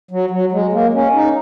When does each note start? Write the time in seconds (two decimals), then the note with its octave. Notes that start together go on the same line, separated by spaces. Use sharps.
0.11 F#3
0.31 F#3
0.52 G#3
0.73 A#3
0.94 C#4
1.15 D#4